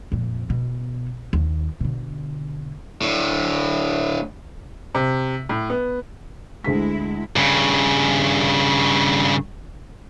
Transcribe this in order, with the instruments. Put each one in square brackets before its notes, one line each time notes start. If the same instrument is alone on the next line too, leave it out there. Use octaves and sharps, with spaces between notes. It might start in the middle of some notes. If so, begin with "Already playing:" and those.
[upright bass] F2 A#2
B2
D#2
B2 D3
[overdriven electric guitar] A2 D3
[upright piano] C3
A2
B3
[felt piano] D2 G#4 B6 [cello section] G#3 E4
[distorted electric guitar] G2 C#3